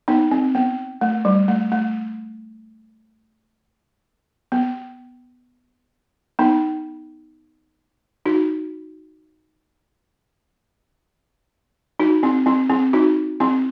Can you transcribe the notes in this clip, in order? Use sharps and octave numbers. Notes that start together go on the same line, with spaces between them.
B3 D#4
C4
B3
A3
G3
A3
A3
B3
B3 D#4
D#4 F#4
D#4 F#4
C4 E4
C4 E4
C4 E4
D#4 F#4
C4 E4